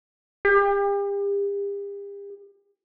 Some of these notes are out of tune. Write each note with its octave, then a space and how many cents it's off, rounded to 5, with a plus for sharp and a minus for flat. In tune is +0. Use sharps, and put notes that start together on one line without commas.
G4 +40